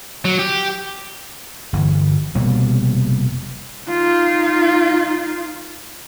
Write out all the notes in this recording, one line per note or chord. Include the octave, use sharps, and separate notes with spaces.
F#3
G4
G1 E3
F1 B2 G3 A#3
D#4 F4